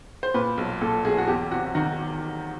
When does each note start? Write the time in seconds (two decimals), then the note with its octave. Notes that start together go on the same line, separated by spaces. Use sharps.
0.23 C5
0.34 A#2 B4
0.57 B1
0.81 A#2 A4
1.05 B1 G#4
1.18 F#4
1.28 E2 G4
1.51 C3 F#4
1.75 D#3 F#4